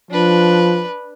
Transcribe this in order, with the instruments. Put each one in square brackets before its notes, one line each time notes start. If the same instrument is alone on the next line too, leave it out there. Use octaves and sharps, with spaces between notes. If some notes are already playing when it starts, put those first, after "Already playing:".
[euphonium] F3 [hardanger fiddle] D4 B4